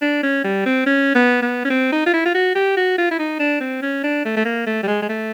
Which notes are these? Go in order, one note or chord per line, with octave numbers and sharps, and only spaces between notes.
D4
C#4
G3
C4
C#4
B3
B3
C#4
C4
D#4
F4
E4
F4
F#4
G4
F#4
F4
E4
D#4
D4
C4
C#4
D4
A3
A3
A#3
A3
G3
G#3
G#3
A3